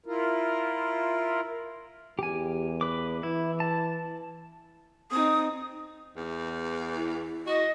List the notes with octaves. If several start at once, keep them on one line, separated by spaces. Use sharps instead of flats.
E4 F4 A#4
E2 G4 G#5
B4 D6
E3 E4
A5
C4 D#4 D#6
E2
E4
F#4 D#5